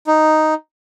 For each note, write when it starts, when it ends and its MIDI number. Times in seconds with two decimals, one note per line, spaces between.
0.07 0.54 63